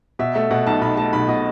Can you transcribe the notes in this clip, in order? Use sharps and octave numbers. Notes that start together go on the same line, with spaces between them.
B2 E5
A3 E5
B2 F#5
B1 A5
B1 B5
A3 A5
B1 B5
B2 D#5